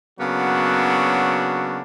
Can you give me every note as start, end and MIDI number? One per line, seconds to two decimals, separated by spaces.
0.20 1.83 49
0.20 1.83 54
0.20 1.83 58
0.20 1.83 59
0.20 1.83 62
0.20 1.83 66